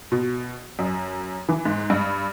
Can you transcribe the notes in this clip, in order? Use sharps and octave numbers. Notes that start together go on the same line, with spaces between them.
B2
F#2
E3
G#2
G2